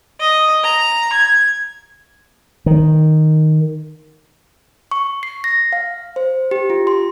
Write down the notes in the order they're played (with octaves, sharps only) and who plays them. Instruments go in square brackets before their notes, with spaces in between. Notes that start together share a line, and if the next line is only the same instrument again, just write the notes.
[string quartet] D#5
A#5
G#6
[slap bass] D#3
[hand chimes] C#6
C7
A#6
F5
C5
G4
F4
C6